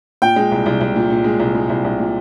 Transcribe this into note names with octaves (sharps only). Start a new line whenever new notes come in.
A#2 G5
G#3
C2
C2
C2
A#2
A#2
G#3
C2
G#3
C2
C2
A#2